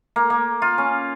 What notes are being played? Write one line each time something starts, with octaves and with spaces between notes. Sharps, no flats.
A#3
A#3
F4
C#4